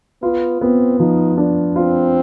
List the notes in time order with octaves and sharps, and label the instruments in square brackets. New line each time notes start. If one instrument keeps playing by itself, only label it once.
[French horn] B3 [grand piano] F4
[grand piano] B3 [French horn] C4
[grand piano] F3 [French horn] D#4
[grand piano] D4
[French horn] C4 [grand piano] F4